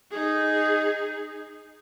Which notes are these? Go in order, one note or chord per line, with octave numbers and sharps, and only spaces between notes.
D#4 G#4